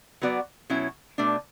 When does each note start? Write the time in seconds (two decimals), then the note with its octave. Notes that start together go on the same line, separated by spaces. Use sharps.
0.22 F#3 B3 F#4 B4 D5
0.70 B2 F#3 C#4 E4
1.18 B2 A3 D4